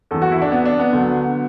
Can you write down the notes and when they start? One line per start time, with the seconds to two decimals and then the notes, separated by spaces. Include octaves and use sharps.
0.11 E2 E3 A4
0.22 F#4
0.31 E4
0.42 D4
0.52 B3
0.65 D4
0.80 B3
0.93 D2 D3 F#3